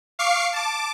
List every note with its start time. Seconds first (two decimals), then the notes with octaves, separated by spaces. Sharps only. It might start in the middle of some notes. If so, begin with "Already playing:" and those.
0.19 F5 C#6 D6 C7
0.53 A5 D6